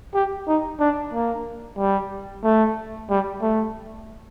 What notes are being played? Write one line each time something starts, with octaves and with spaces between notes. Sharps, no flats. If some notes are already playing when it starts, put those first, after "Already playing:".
G4
D#4
D4
A#3
G3
A3
G3
A3